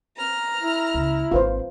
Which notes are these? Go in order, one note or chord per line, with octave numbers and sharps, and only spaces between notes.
A#5 F6
E4
C#2 C#4
G#1 C4 F4 B4 C5